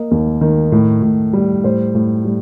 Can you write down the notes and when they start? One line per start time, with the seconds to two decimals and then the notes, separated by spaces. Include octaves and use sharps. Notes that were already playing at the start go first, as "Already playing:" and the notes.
Already playing: A#3 D#5
0.11 D#2
0.41 D#3
0.72 A2
1.03 A2
1.33 G3
1.64 A2 C5
1.95 A2
2.25 G3